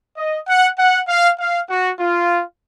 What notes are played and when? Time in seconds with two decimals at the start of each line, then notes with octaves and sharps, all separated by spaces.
0.17 D#5
0.48 F#5
0.78 F#5
1.08 F5
1.39 F5
1.70 F#4
2.00 F4